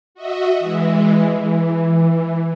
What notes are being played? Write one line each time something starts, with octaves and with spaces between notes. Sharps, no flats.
F#4 D#5 E5
E3 G#3
E3